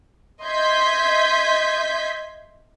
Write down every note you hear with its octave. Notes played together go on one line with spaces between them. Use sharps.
D#5 E5 C6 G6 G#6 B6